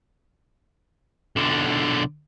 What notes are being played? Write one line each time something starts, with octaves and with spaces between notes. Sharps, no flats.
B1 D3